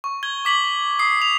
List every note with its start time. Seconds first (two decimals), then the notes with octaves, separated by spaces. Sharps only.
0.04 C#6
0.23 G#6 G7
0.45 D6 B6 F#7 G7
0.99 D#6 C7
1.22 F7